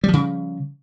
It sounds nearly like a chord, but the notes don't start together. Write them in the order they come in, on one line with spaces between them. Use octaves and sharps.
G3 F3 C#3